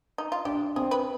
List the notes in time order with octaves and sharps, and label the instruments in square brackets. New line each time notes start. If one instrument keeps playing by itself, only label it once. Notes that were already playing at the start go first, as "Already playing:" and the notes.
[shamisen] D#4
F4
[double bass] D4 [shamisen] G4
[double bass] C4 [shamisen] G#4
[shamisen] B4